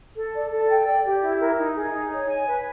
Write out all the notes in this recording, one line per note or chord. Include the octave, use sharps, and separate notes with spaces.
A4
D5
A4
G5
D5
G4
E4
A#4
D#4
G#4
D#4
C#5
G#5
B4